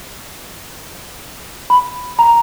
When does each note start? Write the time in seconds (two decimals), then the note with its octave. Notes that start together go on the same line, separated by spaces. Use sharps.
1.70 B5
2.19 A#5